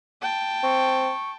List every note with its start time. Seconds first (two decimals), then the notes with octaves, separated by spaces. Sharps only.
0.21 G5 A5
0.63 C4 C#6